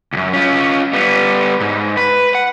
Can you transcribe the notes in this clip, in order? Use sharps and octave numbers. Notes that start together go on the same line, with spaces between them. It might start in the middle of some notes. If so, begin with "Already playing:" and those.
C#2 F#2
C#4 F4
G3 B3
G#2
B4
F#5